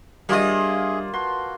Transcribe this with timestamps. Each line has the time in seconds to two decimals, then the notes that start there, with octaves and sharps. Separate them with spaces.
0.29 G3 A#3 D4 F4 G#4 D#5 E5
1.13 F#4 B4 A5 C6